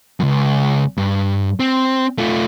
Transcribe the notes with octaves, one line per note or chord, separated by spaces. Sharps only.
C#2 F#2
G2
C4
A3 F4